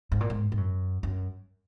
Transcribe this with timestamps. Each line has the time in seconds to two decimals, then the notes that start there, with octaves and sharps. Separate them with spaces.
0.12 G#2
0.21 A#2
0.30 G#2
0.52 G#2
0.57 F#2
1.03 F#2